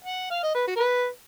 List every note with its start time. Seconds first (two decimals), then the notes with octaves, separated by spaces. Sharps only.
0.05 F#5
0.31 F5
0.43 D#5
0.55 B4
0.68 F#4
0.77 A#4
0.80 B4